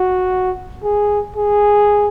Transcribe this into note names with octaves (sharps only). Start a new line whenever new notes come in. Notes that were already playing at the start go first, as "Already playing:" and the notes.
Already playing: F#4
G#4
G#4